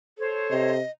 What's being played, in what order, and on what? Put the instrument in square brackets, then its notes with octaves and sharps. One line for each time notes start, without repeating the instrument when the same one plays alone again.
[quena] A4 [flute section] C5 C#5
[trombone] C3 [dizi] D#5